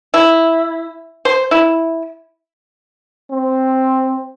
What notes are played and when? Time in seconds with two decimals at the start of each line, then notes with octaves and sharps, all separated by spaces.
0.14 E4
1.25 C5
1.51 E4
3.31 C4